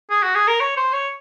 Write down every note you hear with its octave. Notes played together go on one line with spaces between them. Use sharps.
G#4
F#4
G#4
A#4
C#5
C5
C#5